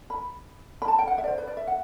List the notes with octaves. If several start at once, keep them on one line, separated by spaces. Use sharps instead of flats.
B5
B5
A5
G5
F#5
E5
D5
C5
B4
D5
E5
F#5